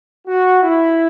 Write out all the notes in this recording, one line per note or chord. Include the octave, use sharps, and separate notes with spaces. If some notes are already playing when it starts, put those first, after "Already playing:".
F#4
E4